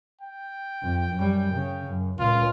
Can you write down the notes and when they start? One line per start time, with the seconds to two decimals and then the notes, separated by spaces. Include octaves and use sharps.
0.21 G5
0.83 F2
1.15 F#2 G3
1.54 C#3
1.87 F#2
2.20 C#2 A#2 F4